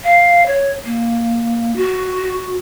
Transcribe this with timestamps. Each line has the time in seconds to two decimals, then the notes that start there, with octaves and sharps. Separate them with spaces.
0.04 F5
0.47 C#5
0.85 A#3
1.76 F#4